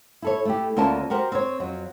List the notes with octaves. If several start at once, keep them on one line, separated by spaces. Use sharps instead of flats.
E4 A4 C#5
A3 E4 G4
D2 A#3 C#4 F4 A#4 A5
F#4 G4 A#4 C5
C4 C#5
F2 F#3